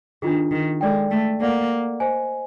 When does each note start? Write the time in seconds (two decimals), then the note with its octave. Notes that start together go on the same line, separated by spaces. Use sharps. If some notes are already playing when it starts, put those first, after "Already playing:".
0.22 D#3 D4 F4 G#4
0.51 D#3
0.81 G#3 A4 D5 G5
1.11 A3
1.40 A#3 A4 D5 F#5
2.00 C5 D#5 G#5